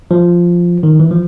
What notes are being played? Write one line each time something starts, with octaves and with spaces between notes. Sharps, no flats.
F3
D#3
E3
F3